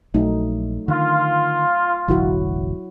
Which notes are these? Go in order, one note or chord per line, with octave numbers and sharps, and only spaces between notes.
A#1 F#3 A3 D#4
D3 D#3 F4
E1 A1 D3 F#3 E4 F#4